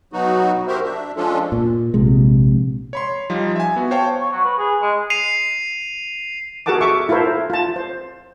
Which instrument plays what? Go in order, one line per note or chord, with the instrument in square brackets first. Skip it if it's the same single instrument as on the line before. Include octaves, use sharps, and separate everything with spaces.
[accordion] B2 F#3 B3 D#4 F#4
F#4 G4 A#4 C5 E5
D4 E5
F3 G#3 C#4 D4 F4 A4
[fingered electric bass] A#2
A#1 C3 G#3
[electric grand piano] C#5 B5 C6
F3 G3 D#4 F4
E5 G#5
B3 F#4
C5 C#5 F5 G5 A5 C#6
[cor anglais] C#5
F#3
B4
G#4
G#3
[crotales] C7 D#7 F7
[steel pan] F#4 G#4 A#4 F#5 A5 D6
A4 E5 C#6 D6
E4 F4 A4 A#4 C5
F4 A5
C5